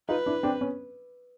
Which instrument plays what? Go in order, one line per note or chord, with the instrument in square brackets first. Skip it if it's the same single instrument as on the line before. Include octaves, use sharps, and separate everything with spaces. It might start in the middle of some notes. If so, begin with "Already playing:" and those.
[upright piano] D#4 F4 [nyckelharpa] B4
[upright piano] D4 E4
C4 D4
B3 C#4